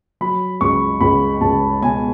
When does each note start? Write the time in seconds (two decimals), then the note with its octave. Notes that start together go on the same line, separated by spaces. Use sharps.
0.21 F#3 B5
0.61 C#2 C#6
1.01 C#2 B5
1.41 C#2 A5
1.82 B2 G#5